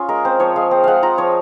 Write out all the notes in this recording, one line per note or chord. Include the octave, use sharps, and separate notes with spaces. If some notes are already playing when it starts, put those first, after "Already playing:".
Already playing: C#4 F4 G#4
G#3 A#4
C4 C5
F3 C#5
G#3 F5
C4
G#3 F5 F#5
F4 A#5
F3 C#5